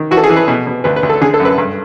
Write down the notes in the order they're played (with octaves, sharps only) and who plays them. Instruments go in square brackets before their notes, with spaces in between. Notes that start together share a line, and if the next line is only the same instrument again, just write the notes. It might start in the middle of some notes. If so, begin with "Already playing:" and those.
Already playing: [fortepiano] D#3
E3 F#4
A4
G#4
E3
B4
B2
B2
D2 B4
B4
D2
A4
D3 G#4
A4
F#2
B4
G2